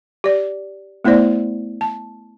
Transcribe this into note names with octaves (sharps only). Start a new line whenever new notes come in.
G4 D5
A3 B3 E4 C5 D5
A5